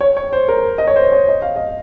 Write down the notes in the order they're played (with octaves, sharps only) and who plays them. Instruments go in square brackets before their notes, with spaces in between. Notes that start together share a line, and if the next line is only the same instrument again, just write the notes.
[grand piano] C#5
C#5
C5
A#4
D#5
C#5
C5
C#5
D#5
F5
D#5